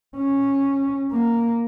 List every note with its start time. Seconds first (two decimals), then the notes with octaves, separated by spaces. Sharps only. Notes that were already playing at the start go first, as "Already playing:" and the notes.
0.18 C#4
1.13 A#3